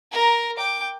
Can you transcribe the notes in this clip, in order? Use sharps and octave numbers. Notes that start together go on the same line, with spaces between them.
A#4 A#5
G5 D6